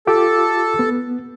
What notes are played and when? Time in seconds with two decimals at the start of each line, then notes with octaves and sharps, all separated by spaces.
0.07 F4 G4 A4 D6
0.79 B3